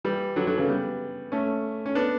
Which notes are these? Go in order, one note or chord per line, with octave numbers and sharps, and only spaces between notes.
E3 G3
D3 F#3
D3 F#3
C#3 E3
G3 B3
A3 C#4
C#4
B3 D4